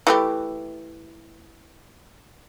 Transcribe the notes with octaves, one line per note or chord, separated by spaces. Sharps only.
E3 A3 G4